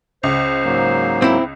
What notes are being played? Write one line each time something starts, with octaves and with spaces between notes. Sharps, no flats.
C#2 C5
G#2 F#3 A#3
C4 E4